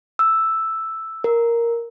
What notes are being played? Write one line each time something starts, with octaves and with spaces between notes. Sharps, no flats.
E6
A#4